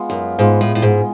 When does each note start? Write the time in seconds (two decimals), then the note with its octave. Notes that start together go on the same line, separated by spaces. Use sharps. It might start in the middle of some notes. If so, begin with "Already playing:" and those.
Already playing: G#3 B3 F4
0.10 F#2
0.39 G#2 G#3 B3 F4 G#4
0.61 A2
0.75 A2
0.82 G#2